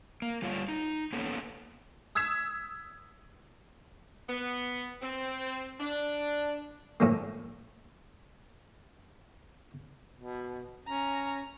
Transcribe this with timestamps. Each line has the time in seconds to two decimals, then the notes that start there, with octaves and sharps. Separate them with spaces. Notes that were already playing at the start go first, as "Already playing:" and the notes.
0.22 A#3
0.42 G3 A3 F4 C#5
0.68 D#4
1.13 A#3 B3 C#4 A4
2.15 D#6 E6 G#6 B6 E7
4.28 B3
5.02 C4
5.80 D4
7.00 A2 F3 A#3
10.16 B2
10.87 C#4 A#5